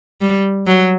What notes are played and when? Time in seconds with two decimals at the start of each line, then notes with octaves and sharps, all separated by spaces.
0.21 G3
0.67 F#3